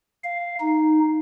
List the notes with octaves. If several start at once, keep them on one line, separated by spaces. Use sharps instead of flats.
F5
D#4